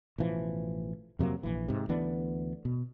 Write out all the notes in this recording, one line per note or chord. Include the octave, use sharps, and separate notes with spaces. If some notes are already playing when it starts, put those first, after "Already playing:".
A1 B2 E3 F3
F2 C3 F#3 A#3
A#1 E3
G#2 C3
D2 E3 B3 D4
B2